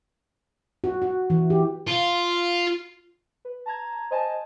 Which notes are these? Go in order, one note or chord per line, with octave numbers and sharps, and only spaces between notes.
F#4
F#4
E3
G4
F4
B4
A5 A#5 G#6
C5 D#5 G#5 A5